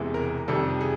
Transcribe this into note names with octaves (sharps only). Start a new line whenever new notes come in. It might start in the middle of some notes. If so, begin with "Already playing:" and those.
Already playing: E1 E2 C3 E3 G#3
A#4
F2 C3 D#3 G3 A4
G#4